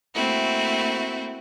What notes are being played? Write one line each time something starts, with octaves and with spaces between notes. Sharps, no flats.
A3 A#3 C4 E4 F#4